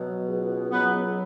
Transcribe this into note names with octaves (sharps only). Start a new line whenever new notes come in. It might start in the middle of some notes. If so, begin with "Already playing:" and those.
Already playing: B2 F#3
C#2
F#3 B3 B4